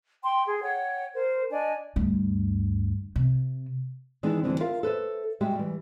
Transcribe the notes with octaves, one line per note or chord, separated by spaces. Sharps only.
G5 C6
G#4
C#5 F#5 G5
A#4 C5
D4 D5 D#5 G#5
D2 G2
C3
D#3 E3 G#3 B3 D4
D2 D3 E3 G3 C4 D4
F4 A#4 E5 F5
A4 B4 C5 E5
G3 G#3 F#4 G4 E5 G5
E3 G3